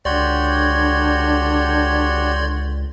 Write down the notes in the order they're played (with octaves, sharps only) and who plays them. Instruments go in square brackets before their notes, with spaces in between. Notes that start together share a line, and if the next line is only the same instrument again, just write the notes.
[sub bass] C#2 [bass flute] D3 [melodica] F#4 G4 C#5 [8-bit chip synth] D5 C6 G#6